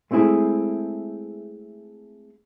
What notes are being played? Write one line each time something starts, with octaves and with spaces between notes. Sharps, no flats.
G#3 A3 C4 E4 G#4